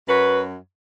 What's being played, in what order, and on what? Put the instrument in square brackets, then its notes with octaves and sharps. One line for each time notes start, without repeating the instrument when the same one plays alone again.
[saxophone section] F#2 F#3 F#4 B4